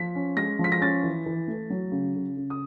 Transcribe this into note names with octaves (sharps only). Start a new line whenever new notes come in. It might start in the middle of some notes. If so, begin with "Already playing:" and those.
Already playing: F3 B6
C#4
G#3 A#6
F3
B6
A#6
C#4 A6
E3
E3
A3
F#3
C#3
C#3
C#3
D#6